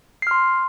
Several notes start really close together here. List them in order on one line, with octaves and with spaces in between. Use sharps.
C7 F6 C6